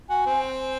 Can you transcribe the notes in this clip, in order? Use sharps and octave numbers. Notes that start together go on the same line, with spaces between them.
F#4 G#5
C4